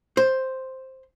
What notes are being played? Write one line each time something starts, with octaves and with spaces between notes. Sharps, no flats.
C5